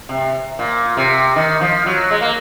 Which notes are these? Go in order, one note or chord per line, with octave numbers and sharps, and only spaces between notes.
C3
A#2
C3
D#3
F3
F#3
G#3
A#3